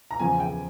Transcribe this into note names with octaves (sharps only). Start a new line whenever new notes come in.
A#5
E2 C#3 F3 G#5
G5